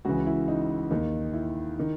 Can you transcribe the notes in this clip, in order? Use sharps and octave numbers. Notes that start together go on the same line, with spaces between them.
C#2 C#3 E3 F#4
E4
D#4
D#2 D#3
E4
D#3